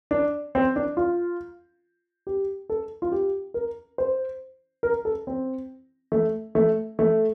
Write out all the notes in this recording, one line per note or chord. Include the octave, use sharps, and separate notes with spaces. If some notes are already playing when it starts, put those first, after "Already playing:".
D4
C4
D4
F4
G4
A4
F4
G4
A#4
C5
A#4
A4
C4
A3
A3
A3